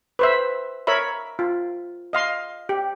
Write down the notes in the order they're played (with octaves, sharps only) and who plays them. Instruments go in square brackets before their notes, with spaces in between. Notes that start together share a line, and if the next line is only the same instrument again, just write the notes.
[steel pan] B4 C5 E5
A#4 C#5 E5 B5
F4
D#5 F5 C6
G4